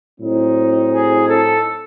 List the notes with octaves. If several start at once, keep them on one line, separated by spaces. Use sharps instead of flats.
A2 F#3 C4 D#4
G#4
A4